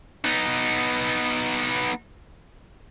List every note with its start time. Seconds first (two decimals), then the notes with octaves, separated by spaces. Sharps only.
0.25 B3 D#4